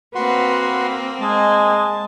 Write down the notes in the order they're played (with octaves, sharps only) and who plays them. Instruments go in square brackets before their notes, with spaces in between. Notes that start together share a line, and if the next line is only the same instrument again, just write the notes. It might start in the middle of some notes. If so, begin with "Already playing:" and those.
[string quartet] A#3 C4 [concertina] F#4 F#5 C6 [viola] B4
[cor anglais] G#3 [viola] D#5 G#5 [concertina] A5